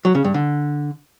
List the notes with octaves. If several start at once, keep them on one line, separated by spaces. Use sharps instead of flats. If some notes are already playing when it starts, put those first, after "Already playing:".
F#3
C#3
G2
D3